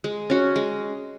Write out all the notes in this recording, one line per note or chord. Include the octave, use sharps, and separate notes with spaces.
G#3
C#4 F#4
G#3